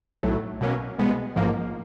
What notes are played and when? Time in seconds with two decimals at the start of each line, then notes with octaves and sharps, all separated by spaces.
0.23 B1 A2 F#3 A3
0.61 B2 F#3 A#3 C#4
0.98 C2 B2 G#3 B3
1.36 A1 G#2 F3 A#3